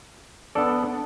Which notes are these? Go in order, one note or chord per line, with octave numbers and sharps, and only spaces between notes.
B3 D4 A4 D5